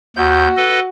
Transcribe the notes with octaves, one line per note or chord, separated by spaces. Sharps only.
D#2 F#4 G6
A4 B4 D#5